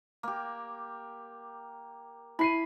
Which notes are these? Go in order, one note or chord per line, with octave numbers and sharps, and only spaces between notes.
A#3 G4
E4 B5 C7 D#7